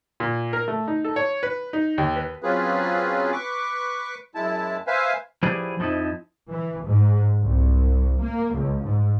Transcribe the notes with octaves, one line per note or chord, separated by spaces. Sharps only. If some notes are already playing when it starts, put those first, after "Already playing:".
A#2
A#4
A3
D#4
A4
C#5
B4
D#4
D#2
B4
F#3 C4 C#4 F4 G#4 B4
B4 C#6 D6
F#2 G#3 E4 A5
B4 C5 E5 F5 G#5
F3 E4 G4 G#4 B4 D5
F2 F3 G#3 C4 D#4 E4
E3
G#2
C2
A#3
C#2
G#2